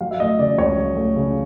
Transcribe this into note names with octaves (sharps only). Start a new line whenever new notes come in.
F#3 F5
E5
A3 D#5
C#3 D5
C#2 C#5
F#3
A3
C#3